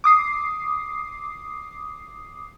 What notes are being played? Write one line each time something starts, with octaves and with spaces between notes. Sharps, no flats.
D6 D#6 C7